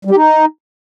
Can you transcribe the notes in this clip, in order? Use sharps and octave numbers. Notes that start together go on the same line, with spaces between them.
G3
G4
D#4